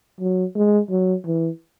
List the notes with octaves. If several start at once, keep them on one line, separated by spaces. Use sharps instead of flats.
F#3
G#3
F#3
E3